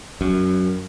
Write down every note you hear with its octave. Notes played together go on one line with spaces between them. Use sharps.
F#2